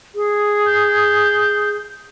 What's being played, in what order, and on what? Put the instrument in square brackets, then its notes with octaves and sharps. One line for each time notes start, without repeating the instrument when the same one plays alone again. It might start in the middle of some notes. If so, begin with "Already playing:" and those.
[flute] G#4
[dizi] G6